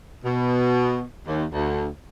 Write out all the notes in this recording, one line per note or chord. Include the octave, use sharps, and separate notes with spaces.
B2
D#2
D2